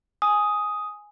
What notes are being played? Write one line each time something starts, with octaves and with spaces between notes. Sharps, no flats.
G#5 D#6